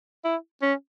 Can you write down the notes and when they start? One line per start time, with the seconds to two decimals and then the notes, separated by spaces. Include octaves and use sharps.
0.24 E4
0.62 C#4